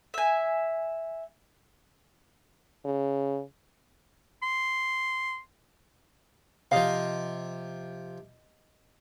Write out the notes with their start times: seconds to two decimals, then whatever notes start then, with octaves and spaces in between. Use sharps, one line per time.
0.14 E5 G#5
2.85 C#3
4.43 C6
6.71 C3 F3 D#5 F5